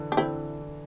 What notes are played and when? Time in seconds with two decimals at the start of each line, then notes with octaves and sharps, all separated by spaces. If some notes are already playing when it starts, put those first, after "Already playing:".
Already playing: D3 E3
0.12 D4
0.17 D3 C4 E4